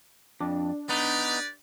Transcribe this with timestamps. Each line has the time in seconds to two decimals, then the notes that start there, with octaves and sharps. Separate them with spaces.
0.40 F2 D4
0.89 B3 D#4 G4 B4 D5